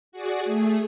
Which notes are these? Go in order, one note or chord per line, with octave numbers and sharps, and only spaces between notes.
F#4 G#4 D5
A3 G#4